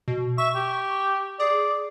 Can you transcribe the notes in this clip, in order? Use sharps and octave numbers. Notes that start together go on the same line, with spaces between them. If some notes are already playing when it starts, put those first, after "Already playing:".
B2
E5 C#6
G4
G#4 D5